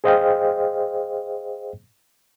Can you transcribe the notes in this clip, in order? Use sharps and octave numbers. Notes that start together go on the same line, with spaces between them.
G#4 C5 D#5 F5 G5